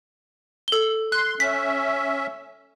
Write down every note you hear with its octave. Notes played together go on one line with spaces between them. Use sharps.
A4 G7
C6 F#6
C#4 E5 B6